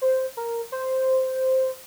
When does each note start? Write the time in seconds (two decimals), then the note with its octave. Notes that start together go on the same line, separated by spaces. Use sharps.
0.02 C5
0.37 A#4
0.72 C5